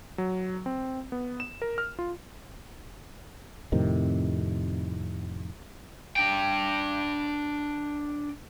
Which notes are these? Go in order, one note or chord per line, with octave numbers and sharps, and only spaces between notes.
F#3
C4
B3
E7
A#4
F6
F4
F2 A2 C3 D#3
D4 G5